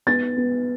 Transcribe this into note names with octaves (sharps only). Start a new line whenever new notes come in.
B3 A6
B3